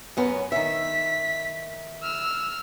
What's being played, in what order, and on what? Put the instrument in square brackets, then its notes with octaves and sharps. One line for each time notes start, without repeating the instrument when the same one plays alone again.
[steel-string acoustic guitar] F#2 B3 C#4
[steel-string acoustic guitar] D#3 E5 [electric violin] B6
[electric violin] E6 F6